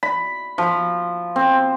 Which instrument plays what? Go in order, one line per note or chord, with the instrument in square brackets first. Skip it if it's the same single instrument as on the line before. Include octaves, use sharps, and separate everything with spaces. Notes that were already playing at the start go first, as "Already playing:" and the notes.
[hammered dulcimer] B5
F3
C4